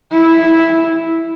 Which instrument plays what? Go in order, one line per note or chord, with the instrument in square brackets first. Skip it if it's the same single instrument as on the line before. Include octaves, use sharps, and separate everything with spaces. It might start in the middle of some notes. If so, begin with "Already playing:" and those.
[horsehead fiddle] E4